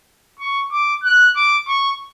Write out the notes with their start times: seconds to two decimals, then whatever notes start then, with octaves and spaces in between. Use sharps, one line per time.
0.39 C#6
0.71 D6
1.04 F#6
1.36 D6
1.68 C#6